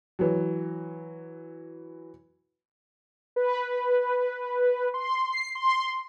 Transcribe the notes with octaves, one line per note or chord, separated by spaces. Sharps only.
E3 F#3
B4
C6
C7
C6